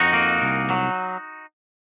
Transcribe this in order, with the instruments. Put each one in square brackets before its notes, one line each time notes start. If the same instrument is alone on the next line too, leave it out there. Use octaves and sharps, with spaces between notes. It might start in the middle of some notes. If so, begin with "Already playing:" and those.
Already playing: [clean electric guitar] F2 D#4 F#4
A#3
C2
F#3